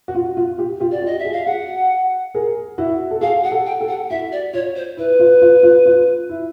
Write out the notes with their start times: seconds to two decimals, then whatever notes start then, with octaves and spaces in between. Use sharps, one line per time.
0.08 F#4
0.15 F4
0.37 F4
0.58 F4 G4
0.80 F4 G4
0.91 F#4 D5
1.02 F4 G4
1.06 D#5
1.19 E5
1.24 F#4 G#4
1.32 F5
1.46 F#4 G#4 F#5
2.34 G#4 A#4
2.78 E4 F#4
3.11 A4
3.21 F#4 G#4 F5
3.44 F#5
3.51 G4 A4
3.66 G5
3.80 G4 A4
3.88 F#5
4.10 E4 F#4 E5
4.32 D5
4.53 F4 C#5
4.76 C5
4.97 E4 B4
5.19 F4
5.42 F4
5.63 F4
5.86 F4
6.29 E4